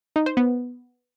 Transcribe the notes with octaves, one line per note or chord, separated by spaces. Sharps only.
D#4
C5
B3